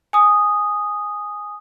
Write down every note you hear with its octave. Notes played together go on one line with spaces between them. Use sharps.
G#5 D#6